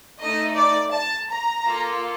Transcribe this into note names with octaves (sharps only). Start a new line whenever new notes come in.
A3 D#4 A4 D#5
D5
A5
A#5
A#3 F4 A4